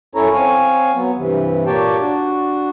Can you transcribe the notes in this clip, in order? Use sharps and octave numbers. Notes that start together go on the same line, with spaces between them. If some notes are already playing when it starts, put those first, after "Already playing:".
F#2 C#4 E4 A4 C#5 A#5
C4 C#5 F5 G#5
F#3 B3
G2 C3 E3
A#2 A#3 G4 C#5 G5 A5
D4 F#4